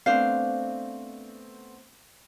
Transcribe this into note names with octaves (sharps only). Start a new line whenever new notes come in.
A3 B3 C4 D4 C5 F5